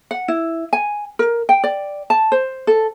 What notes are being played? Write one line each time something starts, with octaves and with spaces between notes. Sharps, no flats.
F#5
E4
G#5
A#4
G5
D5
A5
C5
A4